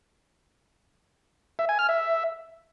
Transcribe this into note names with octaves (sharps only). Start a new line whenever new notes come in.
E5
G#5
F6
E5